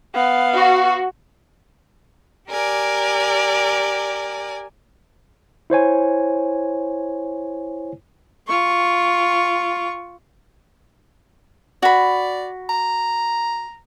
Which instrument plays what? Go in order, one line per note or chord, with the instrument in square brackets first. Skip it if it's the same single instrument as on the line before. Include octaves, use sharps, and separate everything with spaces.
[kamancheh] B3 F5
[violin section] F#4
[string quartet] G4 A#4 D5 G#5
[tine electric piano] E4 C5 C#5 G#5
[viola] F4 C#6
[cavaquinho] F#4 B5 [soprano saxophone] D5
[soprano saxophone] A#5